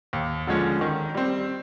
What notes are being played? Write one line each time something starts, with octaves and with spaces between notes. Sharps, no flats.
D#2
D3 F3 G#3 C#4
D#3
G3 C4